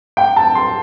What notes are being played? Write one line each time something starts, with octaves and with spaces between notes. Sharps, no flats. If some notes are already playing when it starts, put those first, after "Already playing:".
G5
A5
C6